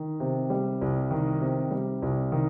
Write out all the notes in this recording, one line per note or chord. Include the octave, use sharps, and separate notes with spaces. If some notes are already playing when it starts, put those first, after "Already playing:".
Already playing: D#3
C3
G3
C2
D#3
C3
G3
C2
D#3